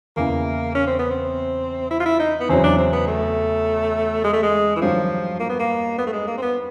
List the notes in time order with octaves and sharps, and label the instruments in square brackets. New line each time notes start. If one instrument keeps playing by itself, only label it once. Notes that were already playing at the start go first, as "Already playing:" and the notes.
[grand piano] E2 C#3 E3 [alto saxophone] A#3
[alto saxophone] C#4
C4
B3
C4
E4
F4
E4
D#4
B3
[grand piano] E2 C#3 F#3 [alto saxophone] C4
[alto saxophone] D4
C4
B3
A3
G#3
A3
G#3
E3
[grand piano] G2 D#3 F#3 [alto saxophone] F3
[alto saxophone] A#3
B3
A#3
B3
A3
G#3
A#3
C4
B3